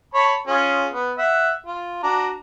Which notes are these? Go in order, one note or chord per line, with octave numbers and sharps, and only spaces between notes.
C#5 A5 B5
C#4 F4 G#4
B3
E5 F#5
F4
D4 F#4 A#5